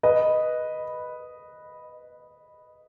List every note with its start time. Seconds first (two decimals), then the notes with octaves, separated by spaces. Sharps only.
0.03 B4 D#5